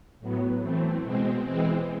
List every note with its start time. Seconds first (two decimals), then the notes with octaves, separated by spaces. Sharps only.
0.20 A2 F#3 B3
0.61 E3 A3 C4
1.03 B2 G#3 C4
1.45 E3 G#3 C4